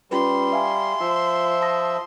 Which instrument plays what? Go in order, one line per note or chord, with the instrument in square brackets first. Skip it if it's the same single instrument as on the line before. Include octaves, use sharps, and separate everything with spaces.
[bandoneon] G3 [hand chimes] C#4 F4 B4 [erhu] C6
[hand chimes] E5 F5 G#5
[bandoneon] F3 E5 [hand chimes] F4
[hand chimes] A5 D#6 A#6